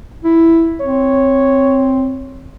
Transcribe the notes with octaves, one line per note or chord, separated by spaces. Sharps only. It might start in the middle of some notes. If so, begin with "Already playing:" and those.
E4
C4 C#5